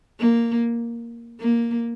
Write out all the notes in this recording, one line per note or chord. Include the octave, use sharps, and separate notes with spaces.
A#3
A#3